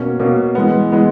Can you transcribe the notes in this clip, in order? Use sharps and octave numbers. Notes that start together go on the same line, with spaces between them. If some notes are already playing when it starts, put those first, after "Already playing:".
Already playing: B2 A#3 C#4
B2 A#3 C#4
E3 G#3 B3
E3 G#3 B3